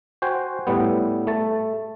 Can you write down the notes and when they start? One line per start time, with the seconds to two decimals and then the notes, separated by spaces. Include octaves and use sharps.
0.22 F#4 C5 G5 G#5
0.67 A2 G3 B3
1.27 A3 A5